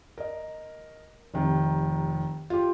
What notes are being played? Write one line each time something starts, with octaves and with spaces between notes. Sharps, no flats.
A#4 D#5
F1 C3 D#3
F4 G4